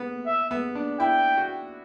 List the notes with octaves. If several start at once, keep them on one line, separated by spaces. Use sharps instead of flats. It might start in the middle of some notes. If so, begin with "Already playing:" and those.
Already playing: B3
E5
B3
D4
E4 G5
F#4